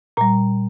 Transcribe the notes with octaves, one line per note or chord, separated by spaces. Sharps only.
A#2 G3 A#5